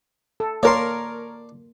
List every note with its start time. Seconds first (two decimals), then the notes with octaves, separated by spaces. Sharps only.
0.40 A4
0.63 A#3 A#4 C#5 D5 A5 C6